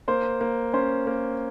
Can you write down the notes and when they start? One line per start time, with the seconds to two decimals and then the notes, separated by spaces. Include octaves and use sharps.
0.08 A#3 C5
0.41 A#3
0.73 C#4 C5
1.07 A#3